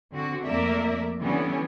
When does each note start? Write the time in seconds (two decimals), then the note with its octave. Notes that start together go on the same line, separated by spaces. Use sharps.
0.12 D3 C4 F#4
0.45 F2 A3 A#3 A#4 D5 E5
1.20 D3 E3 G3 B3 C#4